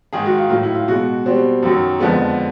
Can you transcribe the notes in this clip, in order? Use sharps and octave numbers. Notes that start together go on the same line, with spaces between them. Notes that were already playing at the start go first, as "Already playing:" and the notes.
G#2 D#3 G#3 G#4
F#4
F4
A2 F#3 F4
E4
F4
B2 G#3 F#4
B2 G3 C4
F#2 D#3 F#3
F2 D3 F3 G#3 B3